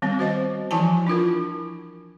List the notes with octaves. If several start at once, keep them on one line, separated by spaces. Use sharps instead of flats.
D#3 G3 B3 C4
F#4 C5 D#5
E3 F3 E4 G#5 A5
D4 E4 F4 A#4